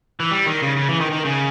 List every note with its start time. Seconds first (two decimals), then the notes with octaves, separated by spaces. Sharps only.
0.20 E3
0.31 G3
0.46 D#3
0.62 C#3
0.77 C#3
0.89 E3
1.00 D#3
1.12 D#3
1.25 C#3